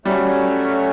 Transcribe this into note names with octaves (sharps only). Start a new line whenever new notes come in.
F#3 G3 A3 C#4